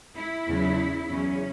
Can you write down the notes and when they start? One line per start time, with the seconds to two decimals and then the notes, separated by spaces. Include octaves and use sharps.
0.16 E4
0.47 E2 C#3 F#3
1.10 E2 C#3 F#3 C#4